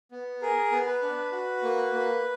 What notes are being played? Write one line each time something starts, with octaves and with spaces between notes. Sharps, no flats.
B3
G#4 A#4
B3
B4
D4
F#4
A#3
A#3